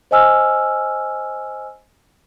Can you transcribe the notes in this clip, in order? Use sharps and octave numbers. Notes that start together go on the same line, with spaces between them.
C5 D#5 G#5 E6 F6